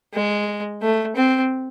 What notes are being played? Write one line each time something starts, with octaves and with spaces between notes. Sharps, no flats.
G#3
A3
C4